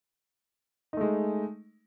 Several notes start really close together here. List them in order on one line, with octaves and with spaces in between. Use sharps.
D#4 A3 G#3